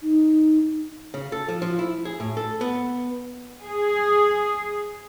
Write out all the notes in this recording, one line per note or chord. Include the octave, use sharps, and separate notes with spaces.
D#4
C#3
A4
F3
F3
E4
G#4
A2
A4
B3
G#4